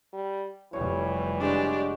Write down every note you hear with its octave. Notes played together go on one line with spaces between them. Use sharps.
G3
F1 E3 G3 C#5
G#3 D4 F#4 G4